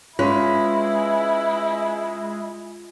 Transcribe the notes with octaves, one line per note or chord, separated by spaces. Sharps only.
G#3 C#4 E4 F4 B4